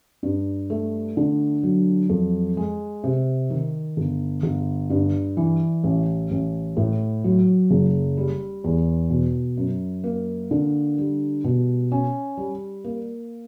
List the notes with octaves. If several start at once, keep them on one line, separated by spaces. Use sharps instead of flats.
G2
A3
D3
F#3
F2
G#3
C3
D#3
G1
G1
G2
E3
A1
A1
A2
F#3
F#1
G3
E2
B2
F#2
A#3
D3
G3
B2
C#4
G3
A#3